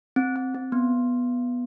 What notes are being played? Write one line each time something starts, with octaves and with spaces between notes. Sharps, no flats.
C4
C4
C4
B3